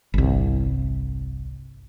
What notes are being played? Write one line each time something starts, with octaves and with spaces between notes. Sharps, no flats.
G1 C2